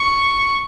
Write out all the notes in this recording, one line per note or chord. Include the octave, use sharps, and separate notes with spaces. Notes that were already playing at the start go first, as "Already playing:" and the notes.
Already playing: C#6